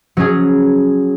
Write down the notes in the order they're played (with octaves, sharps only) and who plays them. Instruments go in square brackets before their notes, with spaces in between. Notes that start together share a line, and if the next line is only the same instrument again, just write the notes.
[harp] F#3 C#4 G#4